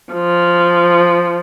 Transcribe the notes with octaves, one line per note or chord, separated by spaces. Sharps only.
F3